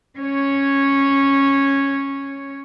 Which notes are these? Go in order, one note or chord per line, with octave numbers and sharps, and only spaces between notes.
C#4 C#5